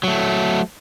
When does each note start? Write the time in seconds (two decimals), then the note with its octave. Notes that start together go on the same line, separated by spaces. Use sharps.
0.03 F#3 A3